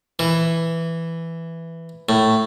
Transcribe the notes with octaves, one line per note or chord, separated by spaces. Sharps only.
E3
A2